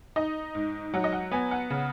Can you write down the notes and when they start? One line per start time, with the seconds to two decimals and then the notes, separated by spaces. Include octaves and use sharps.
0.16 D#4 D#5
0.55 G#2
0.94 F#3 F#5
1.04 D#5
1.13 F#5
1.31 B3 G#5
1.51 F#5
1.70 C#3